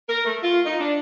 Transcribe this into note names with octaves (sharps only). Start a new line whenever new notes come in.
A#4
A3
F4
D#4
D4